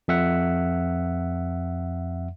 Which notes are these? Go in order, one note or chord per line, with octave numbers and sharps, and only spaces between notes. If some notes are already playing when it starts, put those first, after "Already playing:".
F2 E5 F#5